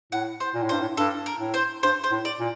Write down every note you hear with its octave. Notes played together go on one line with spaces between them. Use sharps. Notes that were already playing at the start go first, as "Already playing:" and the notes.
A2 F#5
C5
A#2
A2
G2 C5
A2
G2 A4
A#4
A2
C5
G2 C5
C5
A2
D5
A#2